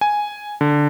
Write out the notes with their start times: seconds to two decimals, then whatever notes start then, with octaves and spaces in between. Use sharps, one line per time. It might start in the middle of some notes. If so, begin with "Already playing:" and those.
0.01 G#5
0.61 D3